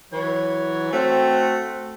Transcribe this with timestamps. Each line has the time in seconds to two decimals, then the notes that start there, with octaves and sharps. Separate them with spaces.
0.11 E3 F#3 C#5
0.92 A3 C4 F#4